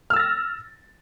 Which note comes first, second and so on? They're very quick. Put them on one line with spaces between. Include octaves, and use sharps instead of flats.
F6 E6 A6 A#6